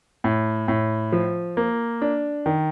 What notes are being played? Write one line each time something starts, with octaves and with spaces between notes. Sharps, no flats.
A2
A2
F3
A#3
D4
D#3